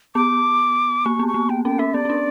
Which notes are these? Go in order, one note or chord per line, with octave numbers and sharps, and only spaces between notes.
B3 D6
A#3 C#6
B3
C#6
A#3
B3 G5
C#4 G5
C#4 E5
B3 D5
C#4
D4